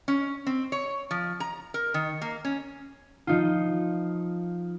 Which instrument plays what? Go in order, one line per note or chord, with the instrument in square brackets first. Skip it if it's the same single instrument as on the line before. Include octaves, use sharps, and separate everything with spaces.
[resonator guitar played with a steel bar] C#4
C4
C#5
F3
A#5
A#4
D#3
A#3
C#4
[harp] F3 D#4 F4